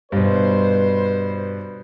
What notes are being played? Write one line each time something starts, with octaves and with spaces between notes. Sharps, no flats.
G2 B2 B4 C5